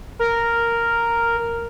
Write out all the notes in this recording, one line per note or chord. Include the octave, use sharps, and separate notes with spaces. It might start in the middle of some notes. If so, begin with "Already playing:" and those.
A#4